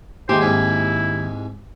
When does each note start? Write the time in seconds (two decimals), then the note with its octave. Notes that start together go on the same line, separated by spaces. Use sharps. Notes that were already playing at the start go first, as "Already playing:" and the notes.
0.29 D#2 G#3 A#3 E4 G4 C5
0.41 C2 G#2 G#3 E4